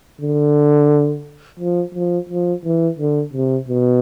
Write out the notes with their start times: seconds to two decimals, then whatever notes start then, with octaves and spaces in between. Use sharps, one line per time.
0.21 D3
1.60 F3
1.94 F3
2.29 F3
2.64 E3
2.99 D3
3.34 C3
3.68 B2